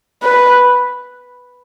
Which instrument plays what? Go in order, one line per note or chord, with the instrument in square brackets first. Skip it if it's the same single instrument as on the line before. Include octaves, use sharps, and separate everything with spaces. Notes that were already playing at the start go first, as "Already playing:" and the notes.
[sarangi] B4